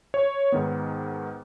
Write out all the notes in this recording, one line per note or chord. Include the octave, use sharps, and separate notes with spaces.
C#5
G#2 D#3 B3